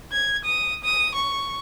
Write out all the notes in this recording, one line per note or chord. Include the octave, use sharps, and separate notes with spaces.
G#6
D#6
D#6
C#6